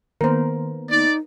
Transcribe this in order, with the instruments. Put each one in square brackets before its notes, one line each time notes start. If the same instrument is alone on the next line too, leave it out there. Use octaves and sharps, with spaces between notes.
[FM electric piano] D#3 A#3 B3 [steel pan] A#4 C5
[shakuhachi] D#4 [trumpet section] D5